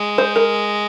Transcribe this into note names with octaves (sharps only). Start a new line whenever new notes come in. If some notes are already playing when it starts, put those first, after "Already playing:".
Already playing: G#3
C5
A#4